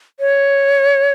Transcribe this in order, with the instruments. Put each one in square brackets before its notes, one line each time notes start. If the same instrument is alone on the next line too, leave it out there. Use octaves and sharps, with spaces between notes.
[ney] C#5